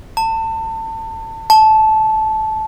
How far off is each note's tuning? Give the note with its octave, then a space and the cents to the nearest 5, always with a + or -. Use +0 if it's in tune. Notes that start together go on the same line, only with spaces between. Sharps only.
A5 +30
A5 -15